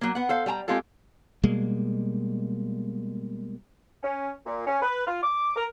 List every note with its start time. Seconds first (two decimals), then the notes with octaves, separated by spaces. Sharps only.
0.01 F#3 A#3
0.15 B3 F#5
0.29 A4 C5 F5
0.46 G3 G5 A5 A#5
0.68 G#3 C4 F4 G4 A4
1.43 B2 G3 G#3 A#3
4.02 C#4
4.46 A#2
4.67 C#4
4.82 B4
5.06 F4
5.23 D6
5.56 A#4